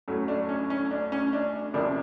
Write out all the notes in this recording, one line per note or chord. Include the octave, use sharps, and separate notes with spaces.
A2 F#3 A3 C#4
D4
C#4
C#4
D4
C#4
D4
C3 F3 A#3 C#4 D4 E4